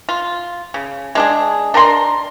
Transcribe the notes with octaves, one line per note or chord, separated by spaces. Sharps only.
F4
C#3
G#3 D4 G#4
D4 A#4 A#5 C6